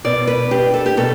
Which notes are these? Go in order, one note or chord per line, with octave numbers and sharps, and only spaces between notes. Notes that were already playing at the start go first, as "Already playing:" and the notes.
B2 D5
B4
D4 G4
A4
G4
B2 A4